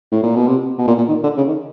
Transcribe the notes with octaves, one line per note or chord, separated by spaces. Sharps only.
A2
A#2
B2
C3
B2
A#2
A#2
D#3
D3
C#3
D#3